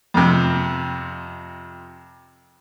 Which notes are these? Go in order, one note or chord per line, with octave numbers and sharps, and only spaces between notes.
F2 C3